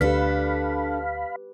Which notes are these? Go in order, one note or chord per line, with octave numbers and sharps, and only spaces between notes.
D2 D4 G4 A4 B4 F5 B5